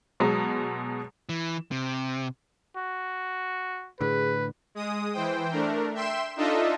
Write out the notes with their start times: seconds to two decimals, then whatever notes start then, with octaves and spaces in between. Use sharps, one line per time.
0.20 B2 F#3 G#3
1.29 E3
1.71 C3
2.77 F#4
4.01 A2 D3 G#4 B4
4.75 G#3 D#6
5.13 E3 C5 G5
5.51 A3 D4 A#4
5.94 E5 G5 C6 E7
6.36 D4 D#4 F4 A4 D#5 E5